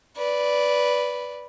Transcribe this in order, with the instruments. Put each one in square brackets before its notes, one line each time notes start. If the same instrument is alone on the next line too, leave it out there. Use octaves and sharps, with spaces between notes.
[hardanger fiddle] B4 D5